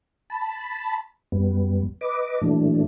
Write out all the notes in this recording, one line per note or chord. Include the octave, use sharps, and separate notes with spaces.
A5 B5
F#2 G3 B3
B4 D#5 D6
A#2 E3 F#3 A3 D4